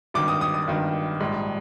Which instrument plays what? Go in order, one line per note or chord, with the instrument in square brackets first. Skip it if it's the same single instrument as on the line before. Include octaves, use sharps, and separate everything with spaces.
[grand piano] G#1 G2 D#3 D6
D#6
D#6
D#6
G#1 G2 D#3
A#1 G#2 G3